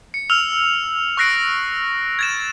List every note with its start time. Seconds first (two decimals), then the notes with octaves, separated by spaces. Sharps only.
0.14 C#7
0.30 E6 F6 F7
1.17 C#6 E6 F#6 A#6 C7 D7
2.19 G#6 A6 E7